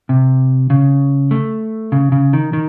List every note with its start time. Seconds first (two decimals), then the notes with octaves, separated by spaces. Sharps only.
0.09 C3
0.70 C#3
1.31 A3
1.92 C#3
2.12 C#3
2.33 D#3
2.53 D#3